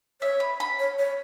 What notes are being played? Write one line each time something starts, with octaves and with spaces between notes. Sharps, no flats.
C#5 E5
B5
B5
C#5
C#5